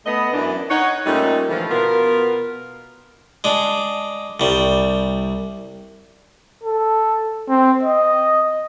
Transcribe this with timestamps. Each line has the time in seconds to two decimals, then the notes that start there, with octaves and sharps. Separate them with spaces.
0.06 A3 B3 D#5
0.32 F#2 E3 D4
0.69 D#4 C#5 F#5
1.06 A#2 G3 A3 A#3 C#4 D#4
1.48 D3 E3 F3 A3
1.71 B2 B3 F4 A#4
3.44 G#3 D4
4.40 C2 G3
6.64 A4
7.49 C4
7.83 D#5